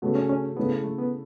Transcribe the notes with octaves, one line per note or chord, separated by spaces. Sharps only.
C#3 A3 B3 F#4
C#4
C#4
C#3 A3 B3 E4
A3
B3